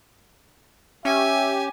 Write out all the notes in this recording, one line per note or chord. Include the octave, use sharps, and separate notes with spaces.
C#4 G4 E5 G#5